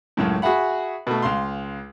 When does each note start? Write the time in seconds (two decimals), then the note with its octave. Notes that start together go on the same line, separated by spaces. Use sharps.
0.17 C#2 F#2 A2
0.42 F#4 G#4 E5 F#5 B5
1.07 B2 A3
1.22 C#2 F5 C6